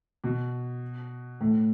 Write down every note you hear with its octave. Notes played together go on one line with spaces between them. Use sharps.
B2
A2